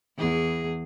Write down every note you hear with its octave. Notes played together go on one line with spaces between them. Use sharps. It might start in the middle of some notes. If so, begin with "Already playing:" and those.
E2 G#4